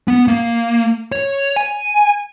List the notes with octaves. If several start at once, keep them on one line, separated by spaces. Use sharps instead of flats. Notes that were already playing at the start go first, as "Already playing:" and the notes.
B3
A#3
C#5
G#5